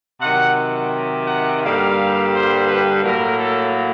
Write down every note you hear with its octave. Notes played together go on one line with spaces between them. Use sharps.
C3 D#3 F#3 F#5
F#5
G2 D3 G3 A#3 F5
C5
B4
A2 F#3 A#3 A#4
A4